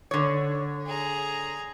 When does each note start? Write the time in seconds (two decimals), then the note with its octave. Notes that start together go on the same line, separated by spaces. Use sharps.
0.11 D3 C#5
0.86 G#4 A#5